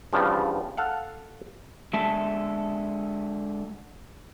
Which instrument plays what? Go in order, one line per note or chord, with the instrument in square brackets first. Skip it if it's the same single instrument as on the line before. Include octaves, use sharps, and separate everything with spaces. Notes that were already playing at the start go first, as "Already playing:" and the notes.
[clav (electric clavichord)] E2 G2 C#3 F3
A4 F5 F#5
[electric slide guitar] D3 G#3 A4 E5 A5